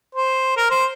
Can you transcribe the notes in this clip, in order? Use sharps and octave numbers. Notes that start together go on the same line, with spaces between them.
C5
A#4
C5